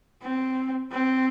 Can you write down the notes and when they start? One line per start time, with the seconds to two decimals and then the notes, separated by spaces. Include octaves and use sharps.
0.22 C4
0.92 C4